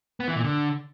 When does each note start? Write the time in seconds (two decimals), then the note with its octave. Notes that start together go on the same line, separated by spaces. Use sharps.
0.20 B3
0.28 E3
0.36 A#2
0.44 D3